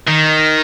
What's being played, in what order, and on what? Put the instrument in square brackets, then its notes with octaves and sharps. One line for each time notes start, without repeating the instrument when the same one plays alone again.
[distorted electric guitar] D#3